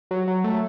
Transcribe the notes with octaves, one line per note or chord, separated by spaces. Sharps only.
F#3
F#3
A3